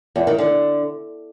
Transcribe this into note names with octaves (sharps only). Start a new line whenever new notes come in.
E2
D#3
D3